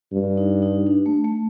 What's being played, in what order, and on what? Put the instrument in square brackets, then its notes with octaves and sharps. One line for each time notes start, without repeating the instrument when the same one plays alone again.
[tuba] G2
[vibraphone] D#4
D#4
D4
A3
A3